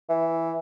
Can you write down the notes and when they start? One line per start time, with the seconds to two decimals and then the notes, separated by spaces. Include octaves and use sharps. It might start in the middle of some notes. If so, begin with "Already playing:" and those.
0.09 E3